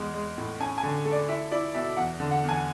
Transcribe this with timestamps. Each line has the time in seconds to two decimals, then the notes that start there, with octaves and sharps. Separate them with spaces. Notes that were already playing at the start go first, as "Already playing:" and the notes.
Already playing: E2 G#3
0.14 G#3
0.38 A2
0.60 C#4 G#5
0.78 G#5
0.83 D3
1.05 A3
1.12 D5
1.29 E4 E5
1.51 E4 D5
1.75 B2 E5
1.97 E2 F#5
2.20 D3
2.31 F#5
2.44 E2
2.49 G#5